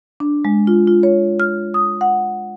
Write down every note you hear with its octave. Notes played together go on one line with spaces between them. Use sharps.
D4
G#3
F4
F4
C#5
F6
D#6
F#5